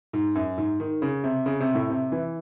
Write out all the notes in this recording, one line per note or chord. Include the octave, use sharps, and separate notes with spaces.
G#2
F#2
G#2
D#3
C#3
C3
C#3
C3
A2
C3
E3